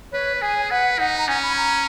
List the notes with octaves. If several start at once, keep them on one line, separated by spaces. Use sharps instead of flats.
B4 C#5
G#4 G#5
B4 F#5
D#4 F#5
A#5
C#4 G#5
B5
A#5